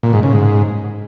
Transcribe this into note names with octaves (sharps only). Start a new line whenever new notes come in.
A#2
G#2
C#3
G#2